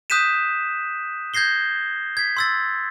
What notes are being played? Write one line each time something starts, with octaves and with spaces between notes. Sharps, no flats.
D#6 F#6 G6 B6 D#7 E7
G6 G#6 A#6 C7 G7
G#6 B6
C6 E6 A6